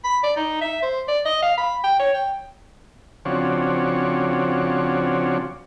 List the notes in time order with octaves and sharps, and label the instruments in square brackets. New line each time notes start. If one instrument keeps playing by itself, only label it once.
[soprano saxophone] B5
D5
D#4
E5
C5
D5
D#5
F5
B5
G5
C#5
G5
[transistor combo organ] C#3 F3 C4 D4 F#4 C#5